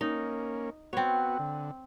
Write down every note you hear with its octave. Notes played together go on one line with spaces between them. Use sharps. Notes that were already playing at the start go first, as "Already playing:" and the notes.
A#3 C#4 D#4
B3 C4 F#4 C#5
D3